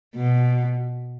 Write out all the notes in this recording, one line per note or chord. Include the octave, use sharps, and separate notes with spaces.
B2